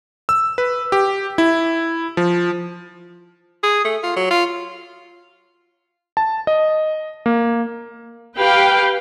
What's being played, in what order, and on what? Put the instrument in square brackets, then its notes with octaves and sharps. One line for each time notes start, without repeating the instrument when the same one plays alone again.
[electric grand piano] E6
B4
G4
E4
F3
[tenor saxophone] G#4
A3
F4
F#3
F4
[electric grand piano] A5
D#5
A#3
[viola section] G4 B4 F5 G5